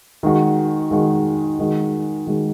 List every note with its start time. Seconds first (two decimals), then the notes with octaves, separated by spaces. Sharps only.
0.23 D#3 G#3 F#4
0.91 D#3 G#3 F#4
1.59 D#3 G#3 F#4
2.27 D#3 G#3 F#4